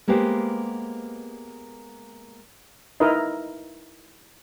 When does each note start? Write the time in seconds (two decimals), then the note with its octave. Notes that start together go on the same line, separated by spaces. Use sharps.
0.07 G#3 A#3 B3 G4 B4 C5
3.00 D#4 E4 A#4 B4 D#5